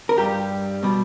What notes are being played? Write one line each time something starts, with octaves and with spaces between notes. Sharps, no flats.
A#4
G2 G3 G4
B2 G3